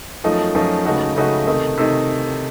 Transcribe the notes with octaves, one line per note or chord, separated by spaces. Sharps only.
F#2 F3 A3 D#4
F#2 F3 A3 D#4
C#2 C#3 A3 D#4 F#4
C#2 C#3 A3 D#4 F#4
C3 D#3 A3 D#4
C3 D#3 A3 D#4